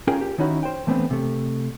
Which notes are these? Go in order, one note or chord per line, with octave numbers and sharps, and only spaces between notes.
C#4 F4 G#4 A#4 G5
G4
D#3 C#4 D#4 E4 F#4
C5 G5
E3 A3 B3 C4 D4
C3 A3